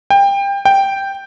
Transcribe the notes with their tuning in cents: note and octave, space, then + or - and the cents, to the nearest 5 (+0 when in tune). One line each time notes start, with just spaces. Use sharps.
G5 +25
G5 +0